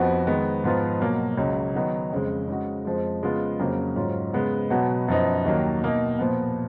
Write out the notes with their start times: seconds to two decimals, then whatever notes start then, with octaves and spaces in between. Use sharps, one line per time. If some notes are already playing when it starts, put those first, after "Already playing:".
Already playing: F2 F3 B3 D#4 F#4
0.27 D#3 G#3 B3
0.64 G#2 F3 B3 F4
1.00 B2 F#3 A#3
1.37 C#2 C#3 F#3
1.75 D#3 F#3 B3 D#4
2.12 F2 C#3 G#3
2.48 C#3 G#3 D#4 F#4
2.85 F2 F3 G#3
3.23 C#3 G#3 B3 F4
3.59 F2 C#3 F#3 A#3 C#4
3.96 G#2 F#3 C#4 F4
4.33 C#3 G#3 B3
4.70 B2 F#3 B3 F#4
5.08 F#2 F3 B3 D#4
5.45 D#2 D#3 F#3 A#3
5.82 B2 A#3 D#4
6.19 A#2 F3 B3